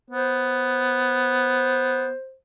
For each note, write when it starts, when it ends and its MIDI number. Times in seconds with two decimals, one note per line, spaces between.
0.10 2.12 59
0.10 2.35 72